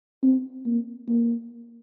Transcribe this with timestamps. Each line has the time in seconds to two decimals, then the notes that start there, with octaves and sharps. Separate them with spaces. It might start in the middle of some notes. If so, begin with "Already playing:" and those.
0.23 C4
0.66 A#3
1.08 A#3